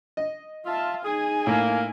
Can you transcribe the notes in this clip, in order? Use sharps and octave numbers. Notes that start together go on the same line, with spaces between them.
D#5
F4 E5 A5
D#4 G#4 G#5
A2 A#3